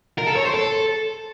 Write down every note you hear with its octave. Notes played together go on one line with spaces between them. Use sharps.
A#4
A4
C#5
C5
A4